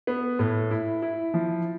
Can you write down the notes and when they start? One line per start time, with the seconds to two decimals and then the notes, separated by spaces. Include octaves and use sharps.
0.07 B3
0.39 A2
0.71 E4
1.02 E4
1.34 F3